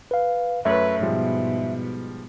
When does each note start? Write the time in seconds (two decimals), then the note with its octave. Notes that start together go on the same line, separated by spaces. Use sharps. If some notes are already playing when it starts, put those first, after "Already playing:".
0.11 B4 F5
0.65 F#2 A3 B4 C#5 E5
1.03 G#2 B2 F3 G3 G#3